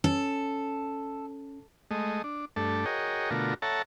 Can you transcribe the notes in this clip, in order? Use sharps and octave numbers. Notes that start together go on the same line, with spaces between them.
C#4 A4
G#3 A3 D#5
D4
G2 A3 D4 A4
F#4 G#4 A#4 C#5 D#5 G5
B2 D3 A3 F4 F#4 A#4
A4 C#5 E5 F#5 A5 A#5